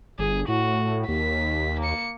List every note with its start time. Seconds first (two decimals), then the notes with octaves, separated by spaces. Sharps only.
0.19 G1 G#4
0.48 A2 F#4
1.08 D#2 B6
1.80 A#3 C#7